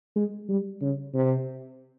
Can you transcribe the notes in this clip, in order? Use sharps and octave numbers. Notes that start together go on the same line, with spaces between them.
G#3
G3
C#3
C3